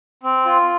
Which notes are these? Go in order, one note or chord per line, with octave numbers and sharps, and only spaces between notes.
C4
F4